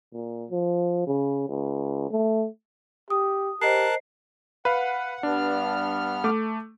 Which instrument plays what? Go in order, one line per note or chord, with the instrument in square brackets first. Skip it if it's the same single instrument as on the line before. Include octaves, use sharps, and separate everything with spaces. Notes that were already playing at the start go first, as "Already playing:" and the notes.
[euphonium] A#2
F3
C#3
C#2
A3
[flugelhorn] G4 [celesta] D#6
[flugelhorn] G4 [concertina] A#4 A5 F#6 [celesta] C5 D#5 C7
[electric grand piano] B4 F5 [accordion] F#5
[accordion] G2 B3 F6 [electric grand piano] D4
[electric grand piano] A3 D6